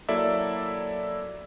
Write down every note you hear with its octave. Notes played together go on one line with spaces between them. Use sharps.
F#3 A#3 E4 A4 D5 E5